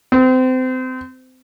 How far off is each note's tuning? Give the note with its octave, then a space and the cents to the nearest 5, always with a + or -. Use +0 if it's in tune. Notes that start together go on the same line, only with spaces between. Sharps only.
C4 -30